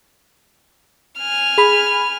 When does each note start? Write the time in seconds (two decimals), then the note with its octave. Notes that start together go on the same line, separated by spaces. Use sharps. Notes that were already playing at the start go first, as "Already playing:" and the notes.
1.20 G#5 F6
1.58 G#4 B5